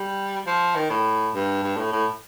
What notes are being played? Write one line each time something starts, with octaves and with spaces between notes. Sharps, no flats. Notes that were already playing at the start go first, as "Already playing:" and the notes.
Already playing: G3
F3
D#3
A2
G2
G2
A2
A2